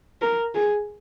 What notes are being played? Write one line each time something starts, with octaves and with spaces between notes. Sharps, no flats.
A#4
G#4